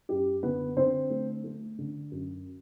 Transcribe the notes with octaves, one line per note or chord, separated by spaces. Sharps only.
F#2 G4
D3 B3 B4
D3 C4 C5
A3
A3
D3
F#2